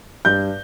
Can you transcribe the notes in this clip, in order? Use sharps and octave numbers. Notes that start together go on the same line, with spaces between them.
G2 G6